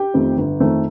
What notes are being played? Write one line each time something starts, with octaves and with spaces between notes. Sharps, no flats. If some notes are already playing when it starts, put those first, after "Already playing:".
Already playing: G4 G5
F2 D#3 A3 C4
G1
F2 D#3 A3 C4